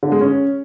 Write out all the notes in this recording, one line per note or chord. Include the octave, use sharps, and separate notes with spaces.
D3
G#3
C#4